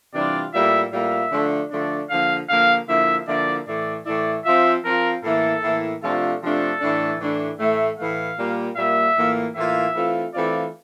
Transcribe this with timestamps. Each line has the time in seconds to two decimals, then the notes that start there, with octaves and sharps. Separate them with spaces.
0.14 C3 E3 G3 D4 F4 D5
0.53 A2 G3 A#3 F4 E5
0.92 A2 G3 A#3 F4 E5
1.31 D3 F3 A3 D4
1.71 D3 F3 A3 D4 D5
2.10 D3 F3 A#3 F5
2.49 D3 F3 A#3 F5
2.89 D3 F3 A#3 E4 E5
3.28 D3 F3 A#3 E4 D5
3.67 A2 E3 A3 E4 D5
4.06 A2 E3 A3 E4 D5
4.45 F3 C4 F4 E5
4.85 F3 C4 F4 A#4
5.23 A2 E3 A#3 E4 A4
5.63 A2 E3 A#3 E4
6.02 C3 F3 A3 D4 F4 A4
6.42 C3 F3 A3 D4 F4 A4
6.80 A2 E3 A3 D4
7.20 A2 E3 A3 D4
7.59 A2 E3 A3 E5
7.98 A2 E3 A3 F5
8.38 A#2 G3 A#3
8.76 A#2 G3 A#3 E5
9.16 A2 E3 A#3 F4
9.55 A2 E3 A#3 F4 E5
9.94 E3 A3 C4 F4
10.34 E3 A3 C4 F4 D5